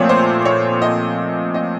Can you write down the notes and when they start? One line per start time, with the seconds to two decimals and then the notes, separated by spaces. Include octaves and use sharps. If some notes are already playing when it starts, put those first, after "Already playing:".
Already playing: A#2 F3 A3 C4 C#5 D5
0.09 C5
0.45 C#5
0.82 D#5
1.54 D#5